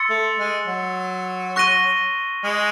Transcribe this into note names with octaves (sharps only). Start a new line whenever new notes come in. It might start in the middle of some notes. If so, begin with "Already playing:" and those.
Already playing: C6 E6 A6 C#7
A3
G#3
F#3
C#6 F#6 A#6 D#7 G7
G#3